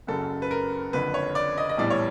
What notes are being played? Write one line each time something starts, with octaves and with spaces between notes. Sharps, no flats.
F#1 F#2 C#3 A4
B4
A#4
F#1 F2 D3 B4
C#5
D5
D#5
D#5
A#1 A2 E3 G3 B3 D5
C#5